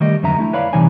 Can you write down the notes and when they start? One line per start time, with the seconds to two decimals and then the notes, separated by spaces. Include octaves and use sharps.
0.01 D#3 G3 A3 G4 D#5
0.23 F2 D3 F#3 E5 A#5
0.38 A3 E4
0.53 B4 C#5 D5 F5 B5
0.73 C3 E3 G3 D#4 C#5 G#5